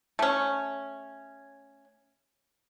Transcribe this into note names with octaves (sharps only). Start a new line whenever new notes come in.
A3 C#4